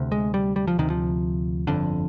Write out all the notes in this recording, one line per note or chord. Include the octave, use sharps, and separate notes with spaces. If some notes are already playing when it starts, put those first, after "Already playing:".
Already playing: D2 C3
G#3
G3
G3
F3
D2 C3 D#3
F3
G1 F2 D3